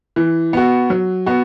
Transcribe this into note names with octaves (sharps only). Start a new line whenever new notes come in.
E3
B3 F#4
F#3
B3 F#4